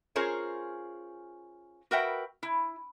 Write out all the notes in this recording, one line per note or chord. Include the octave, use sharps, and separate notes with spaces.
C#4 F4 G#4 A#4 C5 C#5
F#4 A#4 B4 E5 F#5 G5
E4